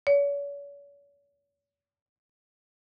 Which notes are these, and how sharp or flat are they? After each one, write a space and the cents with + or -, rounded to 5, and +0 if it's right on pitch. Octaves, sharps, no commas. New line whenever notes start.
C#5 +40